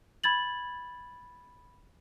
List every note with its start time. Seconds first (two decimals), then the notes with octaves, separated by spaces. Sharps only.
0.24 B5 G#6 A6 F#7